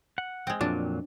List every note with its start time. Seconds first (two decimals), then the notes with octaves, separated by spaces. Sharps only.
0.18 F#5
0.47 G#3 C4
0.61 F2 A#2 F#3 D4